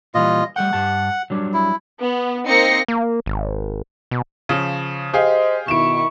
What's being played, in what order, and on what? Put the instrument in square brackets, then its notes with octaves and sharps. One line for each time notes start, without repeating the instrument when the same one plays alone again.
[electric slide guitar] A#2 E3 G3 [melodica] F4 D#5
[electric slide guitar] G3 A3 G5 [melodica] F#5
[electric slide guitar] G2 G4 A5
F#3 G3 D4
[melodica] E4
[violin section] B3
A#3 C4 D#4 A#6 C7 C#7
[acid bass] A#3
G#1
B2
[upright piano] C#3 F3
[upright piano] G4 G#4 F5 [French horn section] C5 D#5
[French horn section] B2 D#3 [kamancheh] E4 C#6 [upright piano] D7 E7